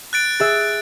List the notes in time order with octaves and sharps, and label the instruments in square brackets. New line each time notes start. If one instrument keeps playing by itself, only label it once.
[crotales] F#6 A6 D7
[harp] G#4 E5 [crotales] A6